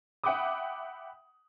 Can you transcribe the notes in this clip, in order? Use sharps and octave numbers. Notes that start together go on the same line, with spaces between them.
E5 F#5 G5 B5 D6 D#6